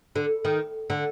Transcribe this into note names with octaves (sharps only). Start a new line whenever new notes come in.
D3
D#3
D3